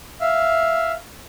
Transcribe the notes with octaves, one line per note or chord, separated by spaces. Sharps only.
E5 F5